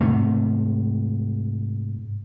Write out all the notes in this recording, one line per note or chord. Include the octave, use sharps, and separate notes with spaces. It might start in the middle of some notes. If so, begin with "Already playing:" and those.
G#2 C3 A3